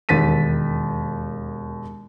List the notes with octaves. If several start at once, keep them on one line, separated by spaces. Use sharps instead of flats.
E1 D#2 A6 B6 D#7